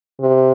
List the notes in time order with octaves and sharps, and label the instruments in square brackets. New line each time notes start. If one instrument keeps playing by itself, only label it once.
[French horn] C3